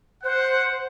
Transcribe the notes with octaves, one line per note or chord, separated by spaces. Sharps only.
C5 F#5